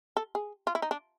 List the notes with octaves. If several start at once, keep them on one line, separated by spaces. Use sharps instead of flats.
A4
G#4
F4
E4
D#4
D4